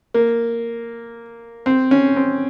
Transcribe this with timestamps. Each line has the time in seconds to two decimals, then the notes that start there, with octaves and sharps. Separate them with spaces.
0.14 A#3
1.66 C4
1.91 C#4
2.16 C4